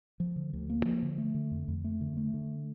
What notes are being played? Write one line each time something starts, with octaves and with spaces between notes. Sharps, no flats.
F3
D3
D2
A#3
F3
D3
A3
D3
F2
F2
A3
D3
A3
D3